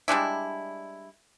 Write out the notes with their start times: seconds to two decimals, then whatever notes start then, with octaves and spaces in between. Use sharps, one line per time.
0.08 G3 G#3 D4 E4